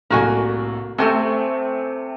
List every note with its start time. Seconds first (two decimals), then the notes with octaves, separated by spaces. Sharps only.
0.10 C2 A2 A#3 F#4 G#5
0.98 C3 A3 C4 A4 C5 G#5